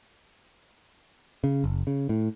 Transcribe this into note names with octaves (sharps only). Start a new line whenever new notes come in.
C#3
F#1
C#3
A2